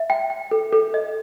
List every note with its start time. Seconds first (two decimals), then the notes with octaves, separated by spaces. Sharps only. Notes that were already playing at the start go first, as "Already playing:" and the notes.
Already playing: E5
0.10 G5
0.30 G5
0.51 A4
0.73 A4
0.94 D#5